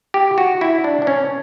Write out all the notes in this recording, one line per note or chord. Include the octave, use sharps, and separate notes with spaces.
G4
F#4
E4
D4
D4
C#4